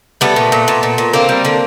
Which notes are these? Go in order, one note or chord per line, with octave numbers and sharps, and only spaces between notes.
G3 A3 B3
A#2
A#2
A#2
A#2
A#2
D3 A#3 C4
G3
D3